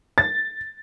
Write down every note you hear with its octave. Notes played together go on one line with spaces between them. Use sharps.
A6